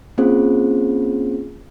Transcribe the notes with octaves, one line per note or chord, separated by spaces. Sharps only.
A#3 C4 C#4 F4 G#4 C5